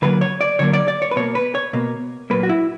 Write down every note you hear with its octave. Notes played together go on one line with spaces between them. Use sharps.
D3 F#3 A#3 B4
C#5
D5
D3 F#3 A#3 C#5
D5
D5
C#5
B4
B2 A#3 C#5
B4
C#5
B2 A#3
A#2 F#3 A#3 B4
F#4
E4